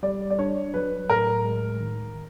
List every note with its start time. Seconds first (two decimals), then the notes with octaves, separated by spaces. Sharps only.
0.03 G3 D5
0.30 D5
0.39 D4 C#5
0.74 F#3 B4
1.09 A2 A#4
1.45 G#3
1.81 D#3